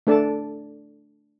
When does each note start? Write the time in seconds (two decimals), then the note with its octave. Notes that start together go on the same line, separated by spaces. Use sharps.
0.07 A3 D4 A4 D5 A5